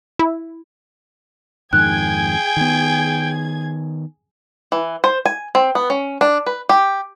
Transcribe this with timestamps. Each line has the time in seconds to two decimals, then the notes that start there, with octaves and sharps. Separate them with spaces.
0.19 E4
1.73 F2 G#2 D#3 G#4 G5 F#6 G#6
2.57 D#3 B3
4.72 E3
5.04 C5
5.26 G#5
5.55 C4
5.75 B3
5.90 C#4
6.21 D4
6.46 B4
6.69 G4